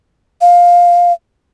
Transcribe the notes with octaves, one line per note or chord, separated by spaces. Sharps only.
F5